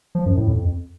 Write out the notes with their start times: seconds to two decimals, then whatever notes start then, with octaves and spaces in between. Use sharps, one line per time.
0.15 F3
0.26 F#2
0.37 A2
0.48 F2